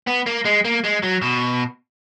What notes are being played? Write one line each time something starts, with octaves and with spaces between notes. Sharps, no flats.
B3
A#3
G#3
A#3
G#3
F#3
B2